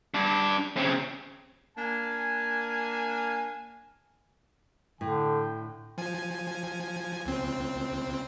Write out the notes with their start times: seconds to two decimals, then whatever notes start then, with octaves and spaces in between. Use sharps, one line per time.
0.14 G2 D4
0.77 C#3 C4
1.78 A#3 D4 F5 G#5
5.01 A2 D3 G5
5.98 F3 G#5
7.26 C#2 C4